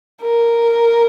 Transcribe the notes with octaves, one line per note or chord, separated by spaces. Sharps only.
A#4